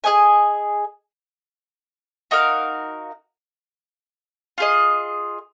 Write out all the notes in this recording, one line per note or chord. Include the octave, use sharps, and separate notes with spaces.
G#4 D#5 G#5
D#4 F#4 A#4 F5
F4 G#4 D#5